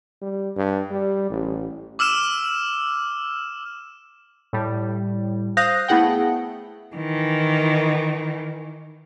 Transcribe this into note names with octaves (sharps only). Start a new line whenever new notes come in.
G3
G2
G3
A1
D6 E6 F6 E7
A2 G3
C5 F5 D#6 F#6 G6 A#6
A3 B3 E4 G#4 F#5 G5
D#3 E3